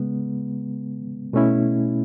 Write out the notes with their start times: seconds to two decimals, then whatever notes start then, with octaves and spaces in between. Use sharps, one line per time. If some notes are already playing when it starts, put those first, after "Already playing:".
Already playing: C#3 G#3 B3
1.33 B2 A3 C#4 E4